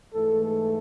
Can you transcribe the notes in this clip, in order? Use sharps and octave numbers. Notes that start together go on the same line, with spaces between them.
G#2 E3 A3 A4
A4